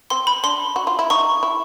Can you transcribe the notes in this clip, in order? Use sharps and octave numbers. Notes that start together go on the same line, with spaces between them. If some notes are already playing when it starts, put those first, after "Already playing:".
C4 C6
B5
D4 C6
F#4
F4
E4
D#4 C#6
E4